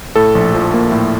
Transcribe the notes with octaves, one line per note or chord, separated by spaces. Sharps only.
A2 A4
A#1
F3
A#3
A2